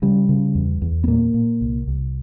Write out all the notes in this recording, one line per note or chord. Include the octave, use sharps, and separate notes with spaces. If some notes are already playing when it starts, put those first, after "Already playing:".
C#3 G3
C#3
E2
E2
B3
A#2 A#3
A#2
C2
C2